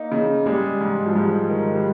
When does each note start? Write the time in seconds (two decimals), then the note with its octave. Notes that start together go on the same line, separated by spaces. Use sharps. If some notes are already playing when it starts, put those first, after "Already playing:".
Already playing: A#3 D#4
0.12 C#3
0.46 G3 G#3
0.81 G#2
1.06 F3
1.15 G#2 G3
1.50 D#3
1.75 G3